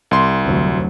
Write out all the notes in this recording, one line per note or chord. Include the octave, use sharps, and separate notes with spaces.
C2 C6
F1 D2 F#3